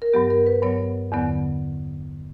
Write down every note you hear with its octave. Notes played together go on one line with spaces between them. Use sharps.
A#4
G2 F#3 B3 G4
A#4
B4
G2 F#3 B3 C#5
E2 D3 F#3 B3